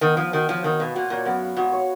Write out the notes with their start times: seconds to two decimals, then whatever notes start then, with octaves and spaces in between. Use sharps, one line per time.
0.01 D#3 B3
0.17 F3 F5
0.33 D#3 F#4
0.49 F3 C#5
0.64 D#3 B3
0.79 B2 F5
0.94 A#2 F#4
1.10 A#2 C#5
1.26 F#2 B3
1.42 F5
1.57 G#2 F#4
1.72 C#5